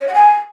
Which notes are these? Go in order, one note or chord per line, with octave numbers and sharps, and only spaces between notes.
C#5
F#5
G#5